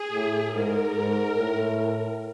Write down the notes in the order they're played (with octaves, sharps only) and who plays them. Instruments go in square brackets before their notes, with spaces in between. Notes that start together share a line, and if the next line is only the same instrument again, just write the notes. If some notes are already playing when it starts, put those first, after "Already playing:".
Already playing: [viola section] G#4
[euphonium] A2
[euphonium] G#2 [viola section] A#4
[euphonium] G#2
A2